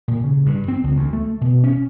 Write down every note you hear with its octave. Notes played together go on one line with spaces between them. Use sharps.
A#2
C#3
G2
C4
C#2
D2
A3
B2
C#4